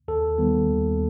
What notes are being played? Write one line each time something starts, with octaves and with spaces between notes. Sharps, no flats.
D#2 A4
D#3 G3 B3
D#2